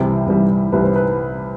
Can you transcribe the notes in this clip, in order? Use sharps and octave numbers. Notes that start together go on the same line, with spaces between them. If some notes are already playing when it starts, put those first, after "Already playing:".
Already playing: C2 C3 E3 G3
C2 C3 E3 G3
C2 C3 E3 G3 B4
C5
B4